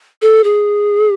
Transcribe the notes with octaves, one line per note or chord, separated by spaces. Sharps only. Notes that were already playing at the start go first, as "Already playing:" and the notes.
A4
G#4